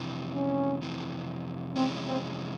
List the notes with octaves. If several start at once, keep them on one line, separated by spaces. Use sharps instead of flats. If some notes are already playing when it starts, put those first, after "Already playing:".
Already playing: F2 C3 E3
C#4
F2 C3 E3
F2 C3 E3 G#3 C4 C#4
C4